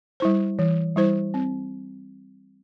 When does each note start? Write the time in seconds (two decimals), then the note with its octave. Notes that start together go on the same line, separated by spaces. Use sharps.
0.20 G3 E4 C5
0.59 E3
0.96 G3 E4 C5
1.34 C4